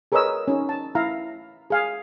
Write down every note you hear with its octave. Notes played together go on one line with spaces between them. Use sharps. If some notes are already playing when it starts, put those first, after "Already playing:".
G#4 A#4 B4 C#5 D#5 E6
C#4 D#4
A5
E4 E5 F5 A#5
G#4 F5 G#5